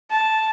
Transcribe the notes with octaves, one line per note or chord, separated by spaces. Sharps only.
A5